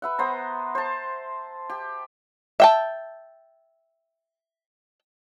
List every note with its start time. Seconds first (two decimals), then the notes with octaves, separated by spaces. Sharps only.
0.02 B4 E5 F#5
0.19 B3 C5 A#5
0.75 C5 A5
1.70 G4
2.60 E5 G5 A5